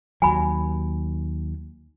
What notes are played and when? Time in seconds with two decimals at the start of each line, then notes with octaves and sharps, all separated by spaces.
0.22 D#2 F#3 G#5 B5